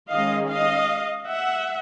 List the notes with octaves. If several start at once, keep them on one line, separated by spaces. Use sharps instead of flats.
D#3 G#3 C#4 D#5 F5
D#5 F5
E5 F#5